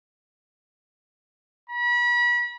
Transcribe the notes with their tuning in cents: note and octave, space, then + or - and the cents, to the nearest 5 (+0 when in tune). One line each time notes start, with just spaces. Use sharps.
B5 -35